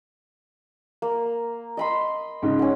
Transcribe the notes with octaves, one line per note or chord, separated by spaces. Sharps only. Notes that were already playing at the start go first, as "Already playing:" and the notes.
A#3
D#5 B5 C6
G#2 C#3 D#4
C#4 F#5